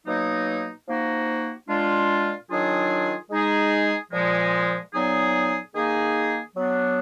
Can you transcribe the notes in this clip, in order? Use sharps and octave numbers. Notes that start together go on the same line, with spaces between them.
B2 F#3 A#3 D#4
F3 A#3 D#4 F#4
A#2 G#3 D4 F4
D#3 F#3 D4 F4 G#4
G#3 D#4 G#4
A#2 F3 G#3
A#2 F#3 B3 D#4 G#4
D#3 A#3 D#4 G#4
F#3 B3 D4